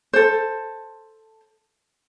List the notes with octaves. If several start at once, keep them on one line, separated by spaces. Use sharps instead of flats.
A4 C5